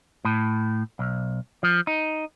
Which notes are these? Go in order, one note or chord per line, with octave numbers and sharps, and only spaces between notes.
A2
B1
F3
D#4